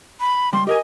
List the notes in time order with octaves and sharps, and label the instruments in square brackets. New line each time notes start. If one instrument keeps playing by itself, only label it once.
[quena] B5
[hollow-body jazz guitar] C#2 G3 [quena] C6
[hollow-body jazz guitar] G4 A#4 G#5 [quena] D#5